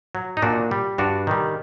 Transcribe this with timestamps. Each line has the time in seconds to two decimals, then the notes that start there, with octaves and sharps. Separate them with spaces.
0.15 F#3
0.37 D#4
0.42 A#2 D4 F#4
0.71 G3
0.98 G2 D4 F#4
1.27 D#3 G3